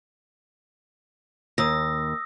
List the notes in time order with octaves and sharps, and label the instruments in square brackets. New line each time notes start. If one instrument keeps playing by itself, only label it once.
[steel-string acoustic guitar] D#2 [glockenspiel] D#6 E6 A#6